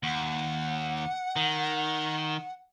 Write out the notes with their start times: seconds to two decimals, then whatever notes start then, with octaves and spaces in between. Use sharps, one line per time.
0.03 D#2 F#5
1.36 D#3